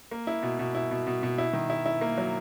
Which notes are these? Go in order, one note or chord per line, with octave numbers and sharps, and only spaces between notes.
A#3
E4
B2
B2
E4
B2
B2
B2
E4
D#3
E4
E4
A#3
F#3